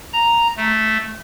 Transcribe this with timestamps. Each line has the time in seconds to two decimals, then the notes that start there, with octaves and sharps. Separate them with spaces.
0.13 A#5
0.57 A3